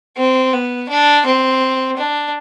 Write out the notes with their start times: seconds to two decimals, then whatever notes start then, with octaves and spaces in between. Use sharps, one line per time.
0.17 C4
0.53 B3
0.89 D4
1.25 C4
1.97 D4